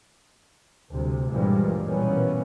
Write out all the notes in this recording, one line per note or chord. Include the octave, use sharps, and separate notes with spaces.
D2 C3 G3
G2 A#2 E3 F3 G3 G#3
B2 E3 G3 A#3 B3 C#4